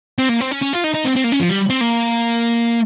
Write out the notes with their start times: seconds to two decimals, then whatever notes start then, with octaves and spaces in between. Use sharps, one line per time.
0.19 C4
0.29 A#3
0.40 C4
0.51 C#4
0.62 C#4
0.73 F4
0.84 D#4
0.94 D#4
1.05 C4
1.16 C4
1.24 A#3
1.32 C#4
1.40 F3
1.49 G3
1.70 C4
1.81 A#3